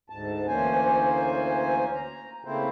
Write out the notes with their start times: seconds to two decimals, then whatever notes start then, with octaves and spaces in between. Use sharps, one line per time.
0.10 D2 G#2 A5
0.48 D2 E3 A#3 C#4 C5 G#5
1.94 A#5
2.45 C#3 A3 A#3 C4 E4 C5